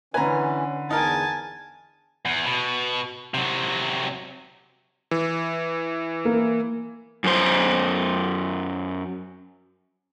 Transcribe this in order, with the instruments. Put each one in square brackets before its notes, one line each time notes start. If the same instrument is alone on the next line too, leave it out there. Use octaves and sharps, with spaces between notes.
[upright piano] D3 B4 [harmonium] E3 C#4 [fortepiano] G#5 A#5
[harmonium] E2 [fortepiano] D#4 A#4 [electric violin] G#5 A5
[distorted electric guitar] E2
B2
C3 F#3
[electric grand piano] E3
[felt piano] A#3
[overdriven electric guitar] F#2 C5